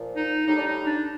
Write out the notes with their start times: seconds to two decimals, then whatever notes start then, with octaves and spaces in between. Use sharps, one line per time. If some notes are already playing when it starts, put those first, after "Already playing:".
Already playing: A#2 F3
0.17 D#4
0.47 A2 G3 D#4
0.57 D4
0.67 D#4
0.86 D4